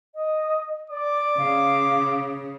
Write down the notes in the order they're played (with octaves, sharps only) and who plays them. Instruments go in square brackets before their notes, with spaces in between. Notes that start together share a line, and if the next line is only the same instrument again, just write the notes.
[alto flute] D#5
[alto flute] D5 [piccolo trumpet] D6
[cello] C#3 [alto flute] F5